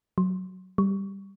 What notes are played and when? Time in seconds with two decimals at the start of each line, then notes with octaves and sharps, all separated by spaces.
0.18 F#3
0.78 G3